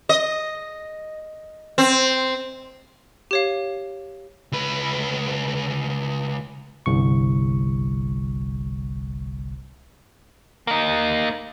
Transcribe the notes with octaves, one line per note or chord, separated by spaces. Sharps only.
D#5
C4
G4 C#5 F5
C#2 B4
G1 C2 C#6
A#3 D#4